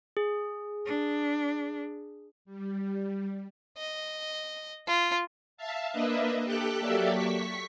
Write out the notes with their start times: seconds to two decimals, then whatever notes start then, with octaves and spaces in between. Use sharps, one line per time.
0.17 G#4
0.86 D4
2.45 G3
3.77 D#5
4.87 F4
5.57 E5 F5 A5
5.92 A#3 D4 B4 D#5 E5
6.45 G4 A4 G5 F#6
6.81 F#3 A#3 G4 A4 D5 E5
7.13 C#6 B6